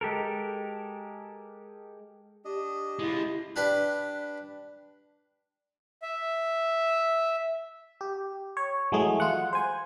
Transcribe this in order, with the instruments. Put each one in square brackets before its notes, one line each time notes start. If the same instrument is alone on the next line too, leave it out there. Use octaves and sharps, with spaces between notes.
[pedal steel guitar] G#3 G4 A4 A#4
[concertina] D4 D#5 [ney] G4
[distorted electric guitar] G#3 F4 [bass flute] E4
[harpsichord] D4 G4 B4
[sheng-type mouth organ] E5
[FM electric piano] G4
C#5
E3 F#3 G#3 A3 G#4
F4 F#5
C5 G#5